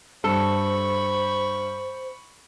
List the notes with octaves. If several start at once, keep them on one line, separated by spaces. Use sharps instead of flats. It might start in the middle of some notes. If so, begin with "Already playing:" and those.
G2 A4 C5 B5 C#6